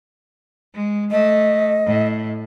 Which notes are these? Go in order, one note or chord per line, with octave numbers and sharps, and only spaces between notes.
G#3
A3 D#5
A2